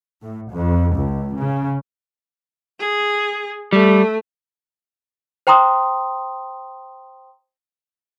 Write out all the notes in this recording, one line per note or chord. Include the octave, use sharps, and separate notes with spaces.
A2
F2
C#2
C#3
G#4
G3 A3
C5 G5 A#5 C6 D#6